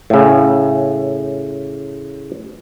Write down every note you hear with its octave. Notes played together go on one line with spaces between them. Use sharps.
A2 C#3